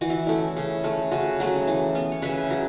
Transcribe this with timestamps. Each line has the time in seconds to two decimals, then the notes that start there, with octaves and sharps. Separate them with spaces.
0.01 E3 F#4
0.10 E4
0.27 A3 C#4 E4
0.57 C#3
0.84 A3 C#4
1.12 C#3 F#4
1.40 F#3 A3 C#4
1.67 E3
1.95 B3
2.12 C#5
2.22 C#3 B4 E5
2.50 F#3